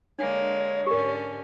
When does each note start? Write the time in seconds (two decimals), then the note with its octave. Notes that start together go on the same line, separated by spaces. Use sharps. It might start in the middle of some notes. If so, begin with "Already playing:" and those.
0.19 D3 G#3 A#3 D4 C#5
0.86 G#2 D3 C#4 G4 A#4